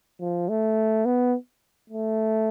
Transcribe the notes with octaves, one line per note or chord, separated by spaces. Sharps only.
F3
A3
B3
A3